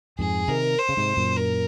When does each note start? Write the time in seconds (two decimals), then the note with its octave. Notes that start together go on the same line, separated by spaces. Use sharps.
0.18 F2 G#2 G#4
0.48 C3 D#3 A#4
0.78 C5
0.89 C#3
0.97 G#2 C3
1.17 F#2 A#2
1.36 A#4